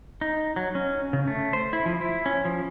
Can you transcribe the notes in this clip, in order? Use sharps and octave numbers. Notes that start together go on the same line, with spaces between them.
D#4
F#3
C#4
C#3
A3
C5
E4
F3
E4
C#4
F3